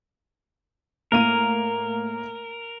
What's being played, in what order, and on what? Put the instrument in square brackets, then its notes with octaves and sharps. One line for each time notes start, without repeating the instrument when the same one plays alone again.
[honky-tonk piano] A2 A#3 D#7 [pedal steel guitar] A#4